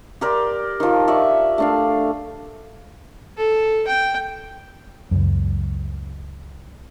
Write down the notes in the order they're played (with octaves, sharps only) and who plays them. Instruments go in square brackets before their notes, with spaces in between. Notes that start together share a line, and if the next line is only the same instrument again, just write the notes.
[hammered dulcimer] G4 A#4 D5 C6
D#3 F3
D5 E5 C#6
A3 D4 F5
[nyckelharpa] A4
G5
[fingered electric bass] C#2 F#2